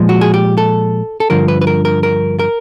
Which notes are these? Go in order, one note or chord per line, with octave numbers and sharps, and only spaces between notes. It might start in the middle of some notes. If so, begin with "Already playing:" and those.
Already playing: A#2 F3 G#3
F#4
G#4
G4
A4
A4
G2 D3 F3 A#4
B4
B4
A#4
A#4
A#4
A#4